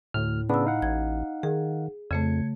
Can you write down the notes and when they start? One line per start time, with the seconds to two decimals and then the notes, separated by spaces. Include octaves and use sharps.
0.14 D2 A2 F6
0.49 C#3 B3 D4 B5 E6
0.65 D#4 F5 F#5
0.82 A1 G#6
1.43 D#3 G#4
2.11 F2 C#3 A3 G#6 C#7